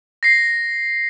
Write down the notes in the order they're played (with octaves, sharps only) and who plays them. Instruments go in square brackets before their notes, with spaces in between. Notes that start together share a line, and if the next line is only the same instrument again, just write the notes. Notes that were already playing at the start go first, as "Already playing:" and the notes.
[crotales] A#6 C7